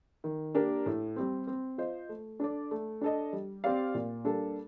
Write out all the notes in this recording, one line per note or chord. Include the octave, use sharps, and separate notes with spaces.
D#3
A#3 D4 G4 A#4
A2
G3 C4
C4
F4 C5 D#5
A3
D4 A4 D5
A3
D4 A4 D#5
G3
C4 G4 D5 F5
A#2
G3 A#3 D4 A4